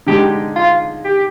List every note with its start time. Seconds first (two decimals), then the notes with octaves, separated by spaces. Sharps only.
0.07 D3 G#3 D#4 G4
0.56 F4
1.05 G4